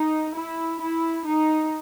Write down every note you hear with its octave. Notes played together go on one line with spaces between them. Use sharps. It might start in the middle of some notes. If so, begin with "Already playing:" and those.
Already playing: D#4
E4
E4
D#4